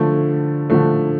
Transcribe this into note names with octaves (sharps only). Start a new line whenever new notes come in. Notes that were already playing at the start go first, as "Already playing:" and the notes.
Already playing: D3 F3 A3
D3 F3 A3